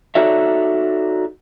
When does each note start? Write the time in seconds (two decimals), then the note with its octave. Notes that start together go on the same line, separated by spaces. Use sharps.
0.15 D#4 F#4 A4 C#5 D5 E5